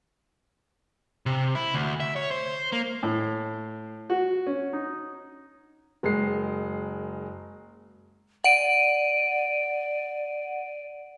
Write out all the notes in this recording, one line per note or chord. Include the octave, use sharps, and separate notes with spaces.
C3
E4
D2
E5
C#5
C5
A#3
A2
F#4
C#4
D#4
F#1 G#3 A#4 C7
D5 F#5 D7 D#7